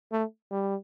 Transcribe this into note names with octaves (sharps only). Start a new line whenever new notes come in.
A3
G3